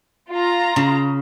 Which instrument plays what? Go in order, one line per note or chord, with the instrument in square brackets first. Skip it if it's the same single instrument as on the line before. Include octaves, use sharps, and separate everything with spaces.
[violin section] F4 A#5
[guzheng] C#3